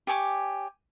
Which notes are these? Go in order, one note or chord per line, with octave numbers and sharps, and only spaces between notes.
G4 C#5 G#5 D6